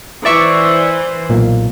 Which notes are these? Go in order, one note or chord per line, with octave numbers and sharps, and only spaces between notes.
E3 C5 D5 E5 C#6
B1 A#2